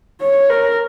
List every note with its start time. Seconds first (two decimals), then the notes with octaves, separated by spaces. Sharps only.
0.21 C#5
0.49 A#4